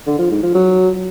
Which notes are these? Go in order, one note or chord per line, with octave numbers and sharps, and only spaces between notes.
D3
F3
G#2
F3
F#3